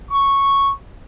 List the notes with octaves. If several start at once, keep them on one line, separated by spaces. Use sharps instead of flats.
C#6